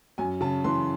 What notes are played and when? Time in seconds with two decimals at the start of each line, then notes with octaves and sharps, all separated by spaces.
0.18 F#2 G#5
0.41 C#3 A5
0.64 E3 C6